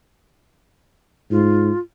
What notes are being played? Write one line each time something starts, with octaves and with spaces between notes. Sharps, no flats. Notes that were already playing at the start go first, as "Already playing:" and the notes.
G#2 F4